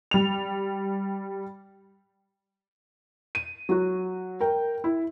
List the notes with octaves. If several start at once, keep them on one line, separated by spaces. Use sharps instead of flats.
G3 F7
D#7
F#3 F#4
A#4 G5
E4